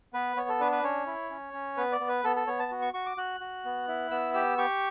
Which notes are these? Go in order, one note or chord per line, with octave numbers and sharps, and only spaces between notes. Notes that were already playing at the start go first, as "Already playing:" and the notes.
B3 B4
B3 C#5
A4
D4 B4
B4
C#4 C#5
E4
C#4
C#4
B3 B4
D5
B3
B4
B3 A4
A4
B3 C#5
A5
F#4
C#6
F#4 C#6
D6
F#4 F#6
F#4
B3
E4
B3 E6
G4 E6
G4 C#6